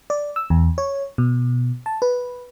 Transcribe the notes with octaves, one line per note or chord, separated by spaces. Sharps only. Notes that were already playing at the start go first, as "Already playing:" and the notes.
D5
E6
E2
C#5
B2
A5
B4